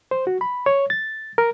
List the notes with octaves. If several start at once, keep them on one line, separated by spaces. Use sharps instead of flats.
C5
F#4
B5
C#5
A6
A#4